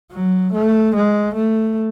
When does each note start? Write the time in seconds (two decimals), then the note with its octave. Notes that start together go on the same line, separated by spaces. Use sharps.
0.11 F#3
0.52 A3
0.94 G#3
1.34 A3